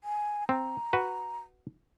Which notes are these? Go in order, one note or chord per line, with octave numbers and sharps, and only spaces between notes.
G#5
C4 A#5
F#4 B4